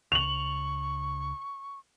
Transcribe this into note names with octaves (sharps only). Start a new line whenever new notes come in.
C#2 C#6 F7 F#7